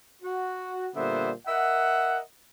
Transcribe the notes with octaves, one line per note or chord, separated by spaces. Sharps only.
F#4
A#2 D3 G3 B3 C5 E5
A#4 D#5 E5 F#5